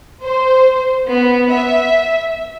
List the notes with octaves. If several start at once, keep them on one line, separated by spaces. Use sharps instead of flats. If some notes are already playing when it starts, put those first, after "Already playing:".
C5
B3
E5